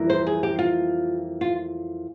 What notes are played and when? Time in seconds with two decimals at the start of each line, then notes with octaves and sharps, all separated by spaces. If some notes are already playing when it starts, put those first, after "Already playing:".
Already playing: F2 E3 G3 A#3
0.10 C5
0.27 G#4
0.43 G4
0.59 F4
1.41 F4